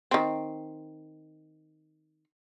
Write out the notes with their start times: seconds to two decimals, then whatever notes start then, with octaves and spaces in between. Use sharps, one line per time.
0.11 D#3 C4